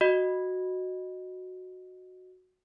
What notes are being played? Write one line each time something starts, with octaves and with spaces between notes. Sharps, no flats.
F#4 D#5